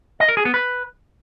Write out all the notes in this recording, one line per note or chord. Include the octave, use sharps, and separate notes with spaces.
D#5
A#4
G#4
B3
B4